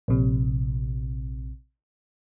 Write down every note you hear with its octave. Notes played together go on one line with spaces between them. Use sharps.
A#1 C3